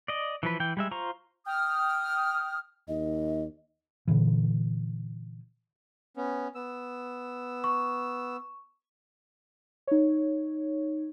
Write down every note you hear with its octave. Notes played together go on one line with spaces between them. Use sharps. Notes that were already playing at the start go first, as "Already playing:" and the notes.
D5 D#5
E3 F3 B4
E3 G5
G3 G#3 E5
F4 C5 A#5 C#6
G5 D#6 F6
D#2 D#5
A#2 D3 E3
B3 C#4
B3 E6
C#6
D#4 C#5